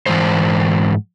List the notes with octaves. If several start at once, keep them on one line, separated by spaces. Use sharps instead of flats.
G#2 E3 C5